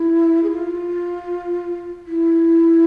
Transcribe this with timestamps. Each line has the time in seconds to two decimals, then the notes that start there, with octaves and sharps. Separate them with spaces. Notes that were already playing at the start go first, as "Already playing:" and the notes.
Already playing: E4
0.43 G#4
0.50 F4
2.06 E4